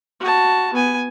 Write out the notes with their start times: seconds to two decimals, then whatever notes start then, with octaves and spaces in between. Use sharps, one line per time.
0.20 F#4 A5
0.73 B3 G#5